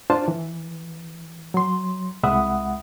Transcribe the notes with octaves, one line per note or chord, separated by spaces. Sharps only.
D4 F4 C5 A5
E3
F#3 C6
C2 G#3 E5 F#5 B5 D#6